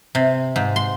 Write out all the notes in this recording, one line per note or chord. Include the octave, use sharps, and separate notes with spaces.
C3
G#2
C6